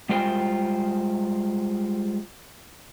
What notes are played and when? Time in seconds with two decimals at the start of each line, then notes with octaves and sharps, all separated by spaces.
0.09 G3 G#3 F4 C5 G5